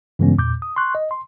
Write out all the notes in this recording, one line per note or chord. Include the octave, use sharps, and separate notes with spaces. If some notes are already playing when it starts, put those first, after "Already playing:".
G2 C#3 E3 G#3 B3 C#4
E2 A#2 D6 G6
D#6
C6 C#6 F#6
D#5
C6